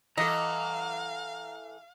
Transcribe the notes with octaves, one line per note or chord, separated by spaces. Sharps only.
E3 A4 D#5 F5 F#5 A#5